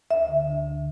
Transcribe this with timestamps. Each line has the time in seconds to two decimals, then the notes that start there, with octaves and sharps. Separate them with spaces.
0.11 D2 E5
0.28 D3
0.47 D2
0.64 D3